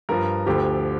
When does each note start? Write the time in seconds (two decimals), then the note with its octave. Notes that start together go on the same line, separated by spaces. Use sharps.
0.09 G2 F3 A#4
0.46 D2 D3 F3 G4